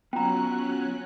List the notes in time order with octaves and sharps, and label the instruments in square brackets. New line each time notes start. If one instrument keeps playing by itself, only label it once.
[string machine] F#3 C#4 F#6 [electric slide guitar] B3 F4 F#5 [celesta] G5 A#5